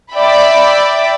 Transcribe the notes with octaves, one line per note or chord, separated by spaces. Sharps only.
D5 E5 G5 B5